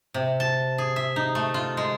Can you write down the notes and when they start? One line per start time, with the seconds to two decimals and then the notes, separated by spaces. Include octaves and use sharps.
0.14 C3
0.40 A5
0.78 G#4
0.96 E5
1.16 D#4
1.35 A3
1.54 F4
1.77 G#3